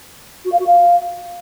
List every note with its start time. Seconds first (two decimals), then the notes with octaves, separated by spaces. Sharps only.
0.45 F#4
0.52 F5
0.59 F#4
0.66 F5